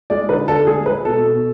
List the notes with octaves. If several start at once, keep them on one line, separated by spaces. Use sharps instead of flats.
G#3 D5
D3 B4
D3 A4
G#3 G#4
G#3 B4
B2 A4
B2